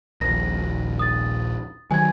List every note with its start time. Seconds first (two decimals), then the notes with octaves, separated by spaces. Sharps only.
0.21 D#1 A#1 A#6
0.99 D#6 A6
1.91 D#3 F#3 G#5 G#6